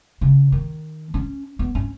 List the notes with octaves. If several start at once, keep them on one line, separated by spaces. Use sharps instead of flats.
C#3
D#3
C#4
B3
C#4